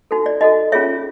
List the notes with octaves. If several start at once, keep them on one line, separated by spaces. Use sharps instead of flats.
D#4 F#4 A4
D5
D#4 F#4 A4 D#5
C#4 F4 G#4 C#5 E5